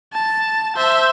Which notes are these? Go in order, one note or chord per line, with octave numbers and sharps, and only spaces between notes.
A5
C5 E5